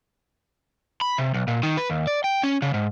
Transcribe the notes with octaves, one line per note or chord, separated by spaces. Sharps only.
B5
C3
B1
A#2
D#3
B4
D#2
D5
G5
C#4
C#3
G#2